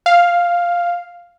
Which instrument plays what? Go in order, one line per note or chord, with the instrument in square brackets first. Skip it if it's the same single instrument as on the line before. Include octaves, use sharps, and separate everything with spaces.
[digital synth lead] F5